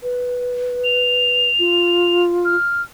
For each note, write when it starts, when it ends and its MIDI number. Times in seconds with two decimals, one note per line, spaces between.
0.03 1.49 71
0.84 2.22 101
1.59 2.55 65
2.45 2.82 89